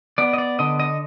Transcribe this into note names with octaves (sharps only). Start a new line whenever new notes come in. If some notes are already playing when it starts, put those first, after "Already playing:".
B3 D5
D#5
D5
D3 D#5
D#5